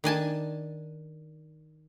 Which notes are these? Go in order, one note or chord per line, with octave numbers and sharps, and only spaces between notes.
D#3 D4 G#5 A5